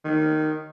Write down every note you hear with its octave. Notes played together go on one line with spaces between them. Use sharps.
D#3